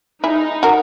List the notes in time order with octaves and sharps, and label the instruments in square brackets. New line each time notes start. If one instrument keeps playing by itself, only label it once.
[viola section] D#4 [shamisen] E4 G#4
[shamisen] F#4 A#4